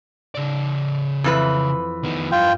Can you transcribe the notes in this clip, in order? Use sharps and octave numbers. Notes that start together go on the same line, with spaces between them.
C#3 D5
F2 E3 B4
D#3 B3
G2 F4 G5